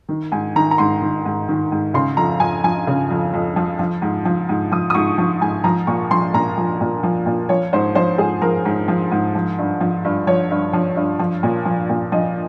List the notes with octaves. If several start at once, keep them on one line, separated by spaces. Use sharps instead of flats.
D#3
G#2 G#5
D#3 A#5
A#5
G#2 C6
D#3
G#2
D#3
G#2
C#3 C6
F2 A#5
F2 G#5
F3 G#5
C#3
F2
F2
F3
F3
G#2
F3
G#2
F3 D#6
D#6
G#2 C#6
F3
G#2 G#5
F3 A#5
A#2 C#6
F3 C6
A#2 A#5
F3
A#2
F3
A#2
F3 C#5
G#2 C5
F3 C5
G#2 G#4
F3 A#4
G#2
F3
G#2
F3
G2
F3
G2
F3 C#5
G2
F3
G2
F3
A#2
F3
A#2
F3 D#5